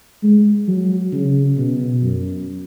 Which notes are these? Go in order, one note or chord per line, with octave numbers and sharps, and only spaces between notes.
G#3
F#3
C#3
B2
F#2